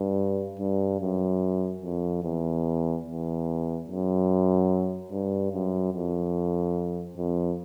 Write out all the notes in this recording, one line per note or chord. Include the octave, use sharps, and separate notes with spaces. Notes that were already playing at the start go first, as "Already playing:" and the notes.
Already playing: G2
G2
F#2
F2
E2
E2
F#2
G2
F#2
F2
F2